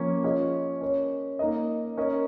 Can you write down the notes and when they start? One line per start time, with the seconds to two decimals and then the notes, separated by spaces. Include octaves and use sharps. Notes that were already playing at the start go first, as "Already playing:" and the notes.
Already playing: F3 A#3 C#4 A#4
0.24 C#4 F4 G#4 D#5
0.81 C#4 A#4 C#5
1.39 A#3 D#4 A#4 D#5
1.97 C#4 A#4 D#5